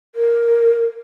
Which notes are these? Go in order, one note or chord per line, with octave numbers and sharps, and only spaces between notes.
A#4